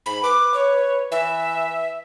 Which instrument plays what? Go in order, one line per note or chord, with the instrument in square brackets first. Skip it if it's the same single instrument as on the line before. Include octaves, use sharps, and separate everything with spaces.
[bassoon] G#2 [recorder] B5
[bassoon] B4 [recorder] D6
[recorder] C#5
[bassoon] E3 [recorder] E5